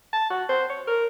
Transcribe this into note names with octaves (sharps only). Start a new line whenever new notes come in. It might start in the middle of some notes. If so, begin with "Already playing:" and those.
A5
F#4
C5
C#5
A#4